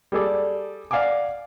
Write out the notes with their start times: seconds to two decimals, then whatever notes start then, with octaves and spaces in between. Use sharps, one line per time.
0.12 G3 G#4 A4 D5
0.91 D5 F5 F#5 G#5 D6